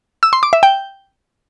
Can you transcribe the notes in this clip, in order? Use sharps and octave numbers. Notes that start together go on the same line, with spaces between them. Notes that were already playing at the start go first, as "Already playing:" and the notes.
E6
C6
D6
E5
G5